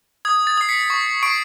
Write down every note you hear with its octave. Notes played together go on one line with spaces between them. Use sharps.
D#6 G#6
A6
D#6 C7
B6 C#7
C#6
C#6 C7 D7